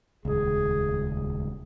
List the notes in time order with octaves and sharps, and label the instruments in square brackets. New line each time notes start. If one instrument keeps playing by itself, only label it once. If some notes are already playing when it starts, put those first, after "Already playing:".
[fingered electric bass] D#1 C#2 [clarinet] G#4